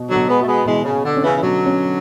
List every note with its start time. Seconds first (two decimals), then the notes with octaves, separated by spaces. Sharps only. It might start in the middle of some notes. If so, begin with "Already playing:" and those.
Already playing: B2 F#4
0.09 D3 F#3
0.16 B2
0.27 G#3 B3
0.41 A3 F#4
0.47 G#3 B3
0.66 B2 E3 G#3
0.84 C#3
0.91 B2
1.04 D3
1.17 C#4
1.23 C#3 E3
1.35 E3
1.41 B2 D3 F#3
1.66 C#4